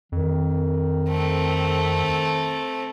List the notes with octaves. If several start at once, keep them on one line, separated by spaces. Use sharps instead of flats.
F2 D#3
A3 C4